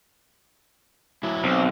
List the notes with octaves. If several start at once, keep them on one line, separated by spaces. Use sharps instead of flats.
F#3 E4
B1 C4